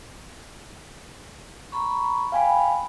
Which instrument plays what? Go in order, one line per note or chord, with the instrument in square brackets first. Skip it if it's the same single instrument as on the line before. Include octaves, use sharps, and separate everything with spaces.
[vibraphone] A#5 B5 C#6
[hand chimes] F5 G#5 B5 [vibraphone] G5